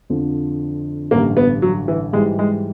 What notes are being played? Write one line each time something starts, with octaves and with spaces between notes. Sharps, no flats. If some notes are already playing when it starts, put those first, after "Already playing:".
F2 D3 F3
A1 G2 D3 A#3
B3
F#3
E3
G#2 E3 G3 G#3
G#3